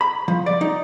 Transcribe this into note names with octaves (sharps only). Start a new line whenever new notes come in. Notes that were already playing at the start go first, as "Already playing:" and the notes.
B5
F3
D5
D#4